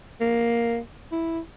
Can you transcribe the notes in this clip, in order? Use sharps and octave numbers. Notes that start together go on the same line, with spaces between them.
A#3
E4